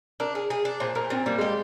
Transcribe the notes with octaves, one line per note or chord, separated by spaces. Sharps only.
D4 A#4
G#4
G#4
D4
A#2 C5
A#2 A#4
A#2 C4
G3 A#3
G#3 G4